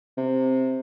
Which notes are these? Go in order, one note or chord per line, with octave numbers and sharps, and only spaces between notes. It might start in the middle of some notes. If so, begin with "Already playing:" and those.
C3